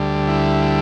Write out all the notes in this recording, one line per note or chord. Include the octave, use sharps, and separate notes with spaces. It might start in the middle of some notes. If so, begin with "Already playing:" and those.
Already playing: D2 D3 G3
E4